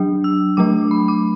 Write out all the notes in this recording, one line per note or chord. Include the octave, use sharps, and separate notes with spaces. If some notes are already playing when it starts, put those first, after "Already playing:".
Already playing: F#3 D4
E6
F#3 A3 D4 D6
B5
D6